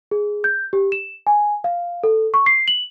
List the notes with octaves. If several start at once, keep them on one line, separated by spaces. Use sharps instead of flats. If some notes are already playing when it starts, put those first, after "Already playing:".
G#4
G6
G4
E7
G#5
F5
A4
C#6
C7
F#7